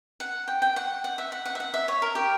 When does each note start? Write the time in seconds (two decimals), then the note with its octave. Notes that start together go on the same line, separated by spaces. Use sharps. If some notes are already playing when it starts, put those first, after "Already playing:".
0.20 F#5
0.48 G5
0.62 G5
0.76 F#5
1.04 F#5
1.18 E5
1.32 F#5
1.46 F#5
1.55 E5
1.60 F#5
1.74 E5
1.88 C#5
2.02 A#4
2.15 G4